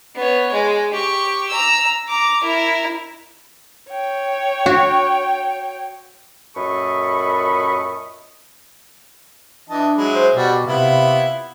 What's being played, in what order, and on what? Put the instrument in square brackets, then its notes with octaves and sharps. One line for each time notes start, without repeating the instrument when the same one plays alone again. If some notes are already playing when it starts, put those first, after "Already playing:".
[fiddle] B3 C#5
G#3
G4 C#6
A#5 E6
A#5 D6
E4 A#4
[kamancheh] C#5 G5
[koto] F#4
[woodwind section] F#2 A#2 A4 D#5 B5 C#6
[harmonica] E3 D#5 A5 [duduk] D4
[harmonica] F#3 G#3 E4
[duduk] C5
[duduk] B2 [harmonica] G3 F#4
[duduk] C3 [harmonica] B3 E4 F4